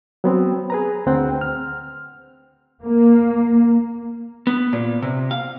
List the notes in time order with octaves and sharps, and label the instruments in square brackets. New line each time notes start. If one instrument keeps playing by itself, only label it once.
[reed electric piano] F#3 B3 C4
G#4 B4 A#5
D2 C4 F#5 G5
F6
[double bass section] A#3
[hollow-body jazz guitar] B3
A#2
C3
F5